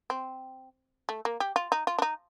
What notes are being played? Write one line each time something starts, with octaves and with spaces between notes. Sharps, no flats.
C4
A3
A#3
G4
F4
D#4
F4
D4
D#4